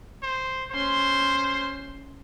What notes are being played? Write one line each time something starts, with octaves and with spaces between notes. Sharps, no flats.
C5
C#4 C5 C6